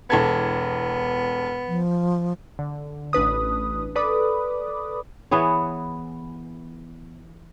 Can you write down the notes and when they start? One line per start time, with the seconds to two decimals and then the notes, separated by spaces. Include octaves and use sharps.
0.10 E1 B3 A4 G#6
1.68 F3
2.59 D3
3.13 A1 D4 B4 D#6
3.95 A4 B4 D5 B5 D6 D#6
5.31 E3 B3 G#4 C#5